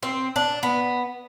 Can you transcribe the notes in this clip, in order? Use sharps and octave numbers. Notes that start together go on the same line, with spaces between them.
C4
D4
B3